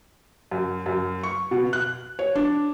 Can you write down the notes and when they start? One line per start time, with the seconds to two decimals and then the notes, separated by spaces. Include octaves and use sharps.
0.51 F#2
0.86 F#2
1.23 C#6
1.51 B2
1.73 F#6
2.19 C#5
2.35 D4